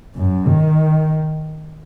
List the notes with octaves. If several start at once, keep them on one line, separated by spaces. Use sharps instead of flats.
F#2
D#3